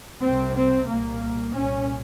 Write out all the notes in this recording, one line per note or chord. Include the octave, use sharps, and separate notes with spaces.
C2 C3 C4
C4
C2 A#2 A#3
C2 A#2 C#4